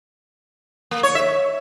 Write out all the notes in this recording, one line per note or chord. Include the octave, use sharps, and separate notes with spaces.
A#3
C#5
E5